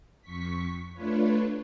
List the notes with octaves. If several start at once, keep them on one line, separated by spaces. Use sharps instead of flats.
F2 C#6 B6
A3 D4 F4 B4 C#5